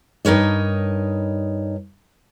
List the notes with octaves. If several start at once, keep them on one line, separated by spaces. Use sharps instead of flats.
G2 D#4 A#4 C#5 D#5